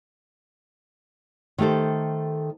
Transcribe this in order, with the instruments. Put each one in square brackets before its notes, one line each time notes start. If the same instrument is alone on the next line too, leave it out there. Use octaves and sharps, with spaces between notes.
[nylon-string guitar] D#3 A3 G4 A4 C5